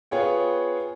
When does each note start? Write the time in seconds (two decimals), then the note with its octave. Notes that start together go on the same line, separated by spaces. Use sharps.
0.11 B3 F4 G#4 C#5 G5